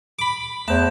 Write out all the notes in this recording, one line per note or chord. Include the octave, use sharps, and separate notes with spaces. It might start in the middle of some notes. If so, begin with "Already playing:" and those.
B5 D6
E2 A3 C5 A5